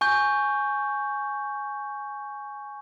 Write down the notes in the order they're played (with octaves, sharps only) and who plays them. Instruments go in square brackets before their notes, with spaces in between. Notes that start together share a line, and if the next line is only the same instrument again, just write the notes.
[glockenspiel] G#5 C#6 G6